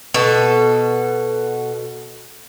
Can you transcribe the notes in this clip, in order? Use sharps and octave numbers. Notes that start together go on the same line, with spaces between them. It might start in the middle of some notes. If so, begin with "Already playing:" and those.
B2 A4